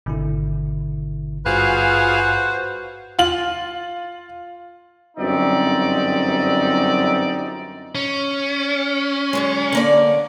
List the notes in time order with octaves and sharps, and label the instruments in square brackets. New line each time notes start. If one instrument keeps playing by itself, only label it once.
[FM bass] G#1 [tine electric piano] B2 D3 E4
[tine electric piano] G2 [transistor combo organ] F4 G#4 F5 [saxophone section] F#4 B4 C5
[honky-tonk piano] F4 F#7
[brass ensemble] G1 F#2 C4 D#4 D5 E5
[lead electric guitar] C#4
[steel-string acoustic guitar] D3 F#3 G#3
D3 A#3 D5